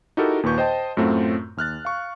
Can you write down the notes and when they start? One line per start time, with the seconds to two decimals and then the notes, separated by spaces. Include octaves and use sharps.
0.17 D#4 E4 F#4 G4 A4 A#4
0.43 D#2 A#2 B4 C#6 G6
0.58 C5 D#5 G5 A5
0.97 F#2 A2 F#3 A3 C4 F4
1.57 D#2 F6 F#6 A6
1.85 F5 C#6